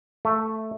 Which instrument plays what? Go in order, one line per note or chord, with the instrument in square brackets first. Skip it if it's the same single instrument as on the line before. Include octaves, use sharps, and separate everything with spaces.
[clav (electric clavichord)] A3